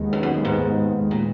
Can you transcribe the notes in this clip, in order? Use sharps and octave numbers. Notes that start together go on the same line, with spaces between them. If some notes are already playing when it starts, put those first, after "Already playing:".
Already playing: D#2 D#3 G#3 B3
F#2
F#2
G#2
A#2